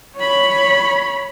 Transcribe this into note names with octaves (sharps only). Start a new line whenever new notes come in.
C#5 B5